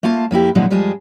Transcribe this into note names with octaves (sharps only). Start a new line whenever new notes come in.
A3 A#3 F4 F5 A5
F2 A#3 E4 G4
A#2 D3 F3 F#3 G#3 E4
F2 G3 G#3 F4 G#4 A5